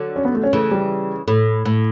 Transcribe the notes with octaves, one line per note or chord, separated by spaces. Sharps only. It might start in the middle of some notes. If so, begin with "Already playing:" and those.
Already playing: D3 F#3
C#4
B3
A3
C#4
C#3 E3 A3
G3
A2 A3
A2